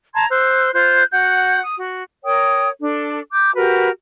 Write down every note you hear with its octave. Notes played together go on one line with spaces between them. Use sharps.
A5 A#5 C6 G#6
C5 E6 F#6
F4 C5 F#6 G6
F#4 F#5 G6
D#6
F#4
A#4 C#5 G5 D#6
D4 A4
D6 G6
F#4 G4 A#4 B4